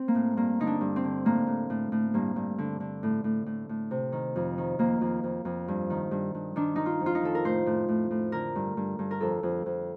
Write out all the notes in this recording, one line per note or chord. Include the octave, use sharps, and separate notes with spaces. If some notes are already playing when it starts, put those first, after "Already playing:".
Already playing: C4
A#3
A2
G2 A#3
D3 D#4
D4
G2
C4
D3
A2 A#3
A2
A2
A2
G2 A#3
G2
D3
D3
A2
A2
A2
A2
C3
D#3
F2
D#3
F2 A#3
F2
F2
F2
G2
D#3
G2
G2
D#3 D4
D#3 D#4
F4
F2
F4
D#4
D#3 A4
A#4
A2 C5
A2
A2
A2
D3 A#4
G2
G2
G2
A#4
F2 A4
F2
F2